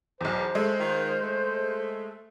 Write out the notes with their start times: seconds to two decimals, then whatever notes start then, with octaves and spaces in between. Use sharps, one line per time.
0.21 B1 E2 C5
0.55 G#3 A3
0.80 D#3 F4
1.24 A3